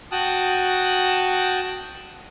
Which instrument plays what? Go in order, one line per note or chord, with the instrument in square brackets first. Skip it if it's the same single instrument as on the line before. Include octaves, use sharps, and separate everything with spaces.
[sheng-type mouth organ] F#4 G5 A5 D#6 F#6